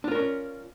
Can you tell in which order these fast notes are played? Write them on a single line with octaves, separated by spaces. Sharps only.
D4 F4 A#4 C#4 D5